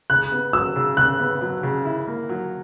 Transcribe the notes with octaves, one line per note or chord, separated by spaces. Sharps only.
C#3 F#6
B3
F#3 E6
C#3
C#3 F#6
B3
F#3
C#3
E4
A#3
F#3